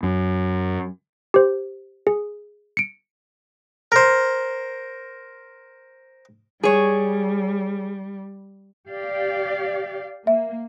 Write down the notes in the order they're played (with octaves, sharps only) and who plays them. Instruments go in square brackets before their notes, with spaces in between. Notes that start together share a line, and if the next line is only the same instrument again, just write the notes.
[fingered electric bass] F#2
[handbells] G4 C5
G#4
C#7 D7
[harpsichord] A#4 C5
[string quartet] G3 [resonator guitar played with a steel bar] G#4 C#5
[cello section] G4 D5 F5
[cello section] A#3 [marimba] E5